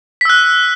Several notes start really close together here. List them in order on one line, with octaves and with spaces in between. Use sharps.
B6 E6 F#6